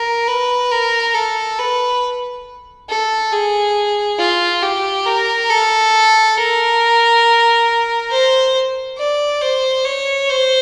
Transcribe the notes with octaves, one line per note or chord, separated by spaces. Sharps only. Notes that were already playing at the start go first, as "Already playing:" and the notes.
Already playing: A#4
B4
A#4
A4
B4
A4
G#4
F4
G4
A#4
A4
A#4
C5
D5
C5
C#5
C5